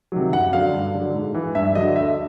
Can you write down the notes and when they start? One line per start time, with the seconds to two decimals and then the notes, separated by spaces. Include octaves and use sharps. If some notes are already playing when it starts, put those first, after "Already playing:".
0.12 C3 D#3 F#3
0.33 F#2 F#5
0.53 D3 F#3 F5
0.73 G2
0.94 D3 F#3
1.14 G#2
1.34 E3
1.55 G2 E5
1.75 D3 F#3 D#5
1.96 D2 E5